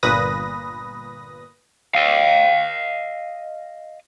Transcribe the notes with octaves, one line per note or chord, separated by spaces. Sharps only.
G1 A#2 B4 D#6 A#6
D#5 F5